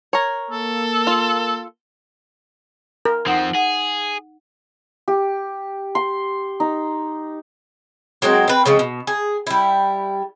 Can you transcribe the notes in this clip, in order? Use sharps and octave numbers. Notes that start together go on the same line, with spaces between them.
A#4 C#5
A#3 A4
F4
A#4
F3 C4 D#4 F#5
G#4 F#5
G4
C6
D#4
F#3 G#3 A#3 C4
C4 B4
C#3 F3 G#3 C4
B2
G#4
G3 E4